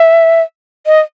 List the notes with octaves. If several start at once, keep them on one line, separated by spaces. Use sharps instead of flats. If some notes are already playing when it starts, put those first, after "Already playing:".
Already playing: E5
D#5